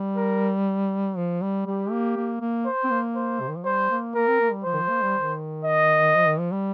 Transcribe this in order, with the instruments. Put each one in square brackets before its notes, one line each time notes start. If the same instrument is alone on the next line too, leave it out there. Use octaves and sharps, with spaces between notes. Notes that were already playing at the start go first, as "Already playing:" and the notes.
Already playing: [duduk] G3
[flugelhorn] A#4
[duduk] F3
G3
[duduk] G3 [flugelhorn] G4
[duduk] A#3
A#3
A#3
[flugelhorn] C5
[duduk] C4
A#3
[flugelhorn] C5
[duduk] C3
D#3
F3
[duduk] G3 [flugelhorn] C5
[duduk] A#3
[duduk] A#3 [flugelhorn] A#4
[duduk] C4
A#3
G3
[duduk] F3 [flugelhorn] C5
[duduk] D#3
F3
A#3
G3
D#3
[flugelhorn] D#5
[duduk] F3
D#3
F3
G3